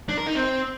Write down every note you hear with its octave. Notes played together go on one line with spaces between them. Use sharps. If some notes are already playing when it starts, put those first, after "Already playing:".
D4
A#4
D#4
C4